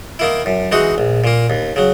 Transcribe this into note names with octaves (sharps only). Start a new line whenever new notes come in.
D#3 A#3 E4
F#2
E3 G#3 D#4 F#4
A#1
A#2 A#3
D#2
C#3 F#3